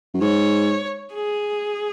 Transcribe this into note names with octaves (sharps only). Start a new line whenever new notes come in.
F#2
G#2 C#5
G#4